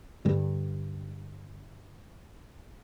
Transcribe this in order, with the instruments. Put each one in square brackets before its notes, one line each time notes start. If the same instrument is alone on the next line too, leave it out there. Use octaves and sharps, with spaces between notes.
[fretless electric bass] G2 D3